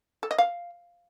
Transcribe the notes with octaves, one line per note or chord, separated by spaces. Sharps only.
A4
D#5
F5